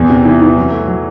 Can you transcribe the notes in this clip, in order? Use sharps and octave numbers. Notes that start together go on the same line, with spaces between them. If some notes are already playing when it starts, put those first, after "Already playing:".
Already playing: E2
C3
E3
E3
F#3
A3
F#3